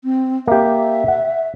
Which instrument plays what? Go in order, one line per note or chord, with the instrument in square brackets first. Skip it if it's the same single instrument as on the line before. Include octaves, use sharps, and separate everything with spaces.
[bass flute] C4
[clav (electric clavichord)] A#3 G4 [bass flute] E5
[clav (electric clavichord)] F#5